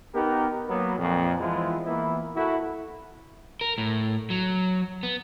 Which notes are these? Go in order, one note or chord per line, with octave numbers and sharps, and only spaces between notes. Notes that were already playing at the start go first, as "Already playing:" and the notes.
B3 D#4 G4 A#4
F#3 A#3 B3
F2 A#2
E3 F3 G#3 B3 E4 F4
E3 A#3 B3 E4
A3 E4 F#4
A#4
A2
F#3
B3